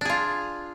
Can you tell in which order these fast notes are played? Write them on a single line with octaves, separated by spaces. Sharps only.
D4 G#4 F4